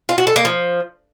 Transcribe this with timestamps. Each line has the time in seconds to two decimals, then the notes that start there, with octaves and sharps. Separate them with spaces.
0.09 F4
0.18 F#4
0.27 A4
0.36 A#3
0.45 F3